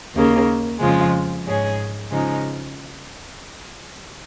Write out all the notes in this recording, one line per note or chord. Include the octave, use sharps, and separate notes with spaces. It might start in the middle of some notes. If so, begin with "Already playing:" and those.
D#2 C#3 A#3
F2 C#3 F3 G#3 F4
G#2 G#3 C#4 G#4
C#3 F3 G#3 D#4